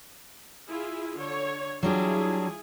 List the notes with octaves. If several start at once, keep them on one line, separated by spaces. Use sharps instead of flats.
E4 F4 G#4
D3 C#5
F#3 G3 D4 E4 F4 G#4